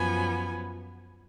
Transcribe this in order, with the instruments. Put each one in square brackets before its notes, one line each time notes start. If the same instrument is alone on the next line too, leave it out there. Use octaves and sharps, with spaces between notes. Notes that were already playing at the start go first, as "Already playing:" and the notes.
Already playing: [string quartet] F#2 F3 B3 G#5